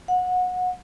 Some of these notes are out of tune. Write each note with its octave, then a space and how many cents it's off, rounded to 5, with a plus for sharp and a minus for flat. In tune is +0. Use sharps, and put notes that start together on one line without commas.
F#5 -25